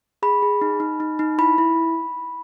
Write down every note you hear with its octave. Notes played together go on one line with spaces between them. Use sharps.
G#4 B5
G#4
D#4
D#4
D#4
D#4
E4 B5
E4